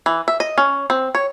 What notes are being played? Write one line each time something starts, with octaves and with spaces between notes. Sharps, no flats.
E3
E5
D#5
C#4
C4
C#5